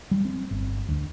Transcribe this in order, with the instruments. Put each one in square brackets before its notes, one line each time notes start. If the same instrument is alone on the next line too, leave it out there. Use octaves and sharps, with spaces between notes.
[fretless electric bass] G3
C4
G1
D2